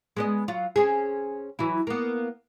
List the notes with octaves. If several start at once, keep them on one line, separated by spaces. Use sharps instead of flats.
G#3 B3 D#5
F#3 F4
C4 C#4 G#4
E3 F#3 E4
A#3 B3